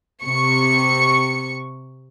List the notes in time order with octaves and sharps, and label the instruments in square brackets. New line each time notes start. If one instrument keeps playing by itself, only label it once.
[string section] C3 C#6 C#7